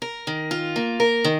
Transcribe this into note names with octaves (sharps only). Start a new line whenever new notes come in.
A#4
D#3
F4
A#3
A#4
D#3